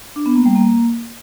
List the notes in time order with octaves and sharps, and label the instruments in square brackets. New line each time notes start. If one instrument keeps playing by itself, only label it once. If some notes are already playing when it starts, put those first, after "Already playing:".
[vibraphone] D4
B3
A#3
G3
A#3